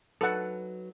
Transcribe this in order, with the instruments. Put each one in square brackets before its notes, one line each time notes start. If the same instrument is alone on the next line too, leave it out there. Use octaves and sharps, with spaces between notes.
[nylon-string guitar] F#3 D#4 B4 [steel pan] A4 F#5